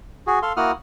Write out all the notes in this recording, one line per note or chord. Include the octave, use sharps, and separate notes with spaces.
F#4 G#4
A4 F5 C6
A#3 E4 F#4 F#5 D#6 F6